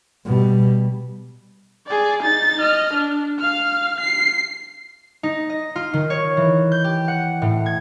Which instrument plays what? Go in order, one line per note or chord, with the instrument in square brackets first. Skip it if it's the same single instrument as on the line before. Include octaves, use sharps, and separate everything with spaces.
[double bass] B2 G3
[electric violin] G#4 D5
D#4 A6
D#5 F6
D4
F5 F6
C7
[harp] D#4
D#5
F4
D#3
C#5
E3
G6
G4
F#5
A2
G#6